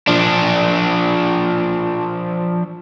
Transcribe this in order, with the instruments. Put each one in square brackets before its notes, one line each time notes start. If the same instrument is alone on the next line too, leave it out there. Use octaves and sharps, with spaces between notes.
[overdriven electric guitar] F3 D4